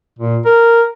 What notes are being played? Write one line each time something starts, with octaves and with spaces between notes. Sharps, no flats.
A#2
A#4